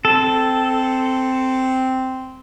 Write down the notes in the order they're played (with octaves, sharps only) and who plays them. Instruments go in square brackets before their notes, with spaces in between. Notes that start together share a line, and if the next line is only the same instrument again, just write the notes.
[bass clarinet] C4 [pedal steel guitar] A4